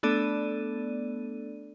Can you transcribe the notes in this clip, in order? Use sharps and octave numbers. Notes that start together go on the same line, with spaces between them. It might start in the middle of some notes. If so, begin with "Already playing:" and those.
A3 B3 D4 A4 D5 D#7